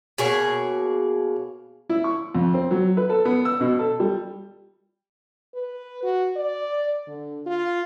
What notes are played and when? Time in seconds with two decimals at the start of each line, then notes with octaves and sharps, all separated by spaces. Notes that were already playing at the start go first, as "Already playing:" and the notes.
0.18 B2 A#3 G#4 C#5
1.89 E4
2.04 C#6
2.35 F2
2.54 C4
2.71 F#3
2.97 B4
3.10 A4
3.25 B3
3.45 E6
3.61 B2
3.79 A4
4.00 G3
5.55 B4
6.03 F#4
6.36 D5
7.07 D3
7.46 F4